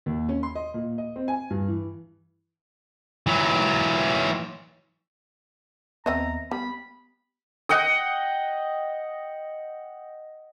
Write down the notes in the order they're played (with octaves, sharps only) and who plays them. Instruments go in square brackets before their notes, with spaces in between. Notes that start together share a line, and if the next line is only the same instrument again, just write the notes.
[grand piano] D#2
C#4
C6
D#5
A#2
D#5
C4
G#5
G2
E3
[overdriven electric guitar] E3 F#3
[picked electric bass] D#2 B3 [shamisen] C4 D#5 E5 [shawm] A#5
[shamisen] G3 [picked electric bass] B3 [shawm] B5
[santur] D#5 F#5 G5 D#6